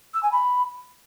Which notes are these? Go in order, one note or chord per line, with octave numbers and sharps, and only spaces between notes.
E6
G#5
B5